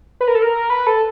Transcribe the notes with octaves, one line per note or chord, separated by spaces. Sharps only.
B4
A#4
A4
A#4
B4
A4